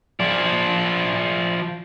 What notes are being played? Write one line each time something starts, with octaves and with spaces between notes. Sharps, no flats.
F3 D5